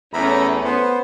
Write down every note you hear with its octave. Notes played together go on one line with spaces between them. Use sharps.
E2 A3 C#4 E5 A#5 B5
B3 C5